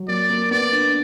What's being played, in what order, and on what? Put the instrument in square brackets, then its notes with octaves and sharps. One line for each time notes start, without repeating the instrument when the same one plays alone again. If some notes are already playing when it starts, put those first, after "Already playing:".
Already playing: [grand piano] F#3
[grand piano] A#3 [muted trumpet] D5
[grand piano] A#3
[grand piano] B3 [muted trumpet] D5
[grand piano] D4